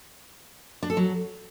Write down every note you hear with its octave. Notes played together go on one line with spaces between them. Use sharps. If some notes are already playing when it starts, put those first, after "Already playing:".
D4
A4
F#3